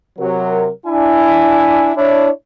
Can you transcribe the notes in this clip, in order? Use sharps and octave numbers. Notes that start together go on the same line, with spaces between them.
C3 F#3 A#4
D4 E4 G#5
D4 E4 C#5